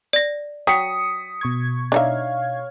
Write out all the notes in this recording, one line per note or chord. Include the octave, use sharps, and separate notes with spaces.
D5 A#6
F#3 G5 D#6 B6 C#7
B2 C#6 G#6
D4 D#4 C#5 E5 F5